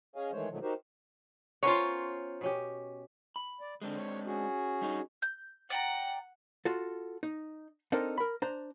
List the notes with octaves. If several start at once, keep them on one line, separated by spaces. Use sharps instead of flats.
C#4 G#4 C#5 D#5 F5 G#5
D#3 E3 G#3 A3 C5 C#5
G#2 B2 D#3 F3 F#3 A3
D#4 F#4 G4 A#4 C5
B3 C#4 F4 A#4 C5 C#5
B2 C#4 G4
B5
D5
D3 G#3 C4 D4
C#5
C#4 F#4 G#4
G2 D#4 C#5
G6
D5 F#5 G5 A#5
F4 F#4 A4
D#4
C4 D4 D#4 A4 A#4 C5
A#4 B5
D4 C5 A#5